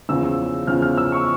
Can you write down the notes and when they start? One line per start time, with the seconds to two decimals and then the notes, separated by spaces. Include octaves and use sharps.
0.09 E2 C#3 F3 E6
0.67 E2 C#3 F3 F6
0.82 F6
0.98 E6
1.12 C#6